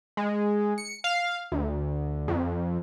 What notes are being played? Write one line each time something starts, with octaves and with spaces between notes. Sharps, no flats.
G#3
C#7
F5
D2
F2